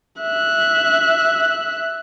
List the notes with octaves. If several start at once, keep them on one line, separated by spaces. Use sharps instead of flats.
E5 F#6